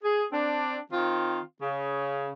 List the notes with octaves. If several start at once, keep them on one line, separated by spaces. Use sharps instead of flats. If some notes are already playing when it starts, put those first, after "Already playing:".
G#4
C4 D4
D#3 C4 F4
C#3